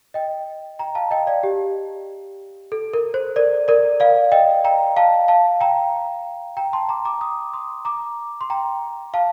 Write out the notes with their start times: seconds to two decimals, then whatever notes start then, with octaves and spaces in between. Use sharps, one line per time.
0.14 D#5 G5
0.79 G5 A#5
0.95 F5 A5
1.11 D#5 G5
1.27 D5 F5
1.43 G4
2.72 A4
2.94 A#4
3.14 C5
3.36 A#4 D5
3.68 A#4 D5
4.00 D5 F5
4.32 D#5 G5
4.64 G5 A#5
4.97 F5 A5
5.28 F5 A5
5.61 G5 A#5
6.57 G5 A#5
6.73 A5 C6
6.89 A#5 D6
7.05 A#5 D6
7.21 C6 D#6
7.53 C6 D#6
7.85 A#5 D6
8.41 C6
8.50 G5 A#5
9.14 F5 A5